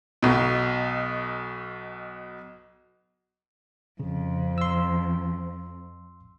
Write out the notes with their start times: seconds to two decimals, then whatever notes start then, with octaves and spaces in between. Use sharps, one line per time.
0.22 B1 B2
4.00 F2 C#3
4.58 C6 E6